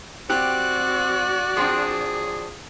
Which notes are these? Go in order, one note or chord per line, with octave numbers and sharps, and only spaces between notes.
C4 F#4 G4 D5 F#6
F3 C4 D4 G#4